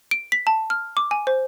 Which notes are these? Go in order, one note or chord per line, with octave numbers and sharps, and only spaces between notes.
D7
B6
A5
F6
D6
G#5
C5